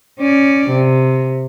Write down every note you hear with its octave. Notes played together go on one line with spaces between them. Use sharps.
C#4 D5
C3